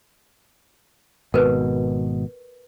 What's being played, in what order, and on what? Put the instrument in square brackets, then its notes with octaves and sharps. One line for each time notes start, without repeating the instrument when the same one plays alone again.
[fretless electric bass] G#1 B2 [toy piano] A#4 B4